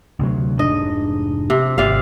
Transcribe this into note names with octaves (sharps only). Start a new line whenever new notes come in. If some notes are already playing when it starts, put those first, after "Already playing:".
D2 C3 F#3
F1 G#2 D4 D#5
C3
G#1 C3 D5 F5